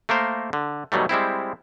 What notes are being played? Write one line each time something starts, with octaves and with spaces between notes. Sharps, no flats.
A3 A#3 A#4 C5
D3
B2 D#3 F#3 G3 A3
G3 G#3 C4 E4